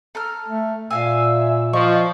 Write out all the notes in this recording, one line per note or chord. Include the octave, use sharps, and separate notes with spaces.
A4 A#5 F6
A3
A#2 E5 F5 G#5 E6
F3 D#5 C#6